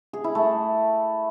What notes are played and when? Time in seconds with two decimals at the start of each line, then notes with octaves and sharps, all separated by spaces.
0.13 G#4
0.24 E4
0.35 A3